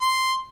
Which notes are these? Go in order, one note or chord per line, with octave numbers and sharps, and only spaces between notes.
C6